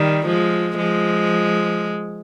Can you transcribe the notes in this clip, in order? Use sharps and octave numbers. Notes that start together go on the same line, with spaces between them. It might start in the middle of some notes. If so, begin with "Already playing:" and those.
Already playing: D#3 G3
F3 G#3
F3 G#3